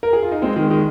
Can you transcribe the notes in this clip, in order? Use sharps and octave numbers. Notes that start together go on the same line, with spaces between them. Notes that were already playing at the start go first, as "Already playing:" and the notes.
A#4
G#4
F4
D#4
G#3 C4
D#3 G#3
D#3 G#3